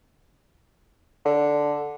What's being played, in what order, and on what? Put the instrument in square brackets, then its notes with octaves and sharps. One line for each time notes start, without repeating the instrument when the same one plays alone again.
[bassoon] D3